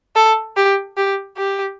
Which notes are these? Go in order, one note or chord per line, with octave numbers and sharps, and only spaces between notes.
A4
G4
G4
G4